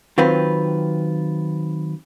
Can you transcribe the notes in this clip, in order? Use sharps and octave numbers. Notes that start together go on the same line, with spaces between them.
D#3 F#3 C4 F4 B4